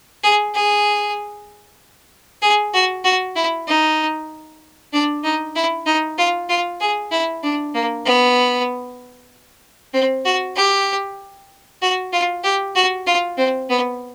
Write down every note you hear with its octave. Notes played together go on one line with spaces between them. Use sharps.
G#4
G#4
G#4
F#4
F#4
E4
D#4
D4
D#4
E4
D#4
F4
F4
G#4
E4
D4
A#3
B3
C4
F#4
G4
F#4
F4
G4
F#4
F4
C4
B3